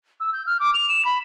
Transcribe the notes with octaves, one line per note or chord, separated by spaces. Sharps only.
E6
G6
F6
D6
F7
E7
B5